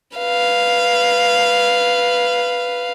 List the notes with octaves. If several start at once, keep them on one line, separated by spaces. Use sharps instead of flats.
B4 F5